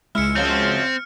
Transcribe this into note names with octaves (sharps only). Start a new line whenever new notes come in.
C#2 G#3 E4 F6 C#7
F#2 F3 F#3 C4